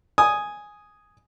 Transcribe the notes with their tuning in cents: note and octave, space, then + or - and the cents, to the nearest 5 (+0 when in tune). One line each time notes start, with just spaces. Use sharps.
G#5 +0 D#6 +0